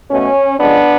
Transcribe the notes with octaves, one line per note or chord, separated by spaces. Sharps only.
B2 A3 C#4
C#3 F3 G#3 B3 D4